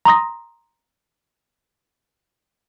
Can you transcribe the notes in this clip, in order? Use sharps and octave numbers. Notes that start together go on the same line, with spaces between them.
A#5 C6 D#6 A#6